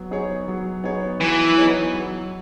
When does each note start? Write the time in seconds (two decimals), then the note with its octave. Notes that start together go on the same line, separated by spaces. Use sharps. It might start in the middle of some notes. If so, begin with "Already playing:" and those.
Already playing: F#3 B3
0.11 B3 D#4 G#4 C#5
0.48 F#3
0.84 B3 D#4 G#4 C#5
1.20 E3 F#3
1.58 B3 D#4 G#4 C#5
1.94 F#3